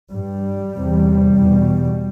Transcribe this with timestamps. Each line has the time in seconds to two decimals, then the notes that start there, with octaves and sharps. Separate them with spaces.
0.13 G2 G3
0.76 E2 C3
1.37 E2 B2